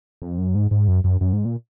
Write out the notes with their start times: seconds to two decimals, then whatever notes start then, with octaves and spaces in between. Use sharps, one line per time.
0.22 F2
0.38 F#2
0.55 G#2
0.71 G#2
0.88 F#2
1.04 F#2
1.21 F#2
1.33 G#2
1.45 A#2